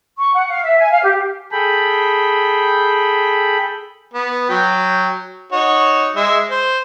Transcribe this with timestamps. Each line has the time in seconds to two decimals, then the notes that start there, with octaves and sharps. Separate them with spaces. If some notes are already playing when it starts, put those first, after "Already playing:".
0.18 C#6
0.34 F#5
0.49 F5
0.64 E5
0.79 G#5
0.91 F5
1.03 G4
1.52 G#4 A4 G5 B5
4.13 B3
4.49 F#3 G5
5.52 D#4 F#4 C#5
6.16 G#3 E5
6.51 C5